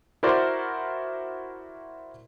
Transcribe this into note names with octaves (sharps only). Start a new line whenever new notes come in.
E4 F#4 A#4 C5 D5